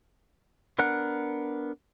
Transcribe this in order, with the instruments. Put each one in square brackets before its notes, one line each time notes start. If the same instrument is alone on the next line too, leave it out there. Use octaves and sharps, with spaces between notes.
[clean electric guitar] B3 D4 A#4 F#5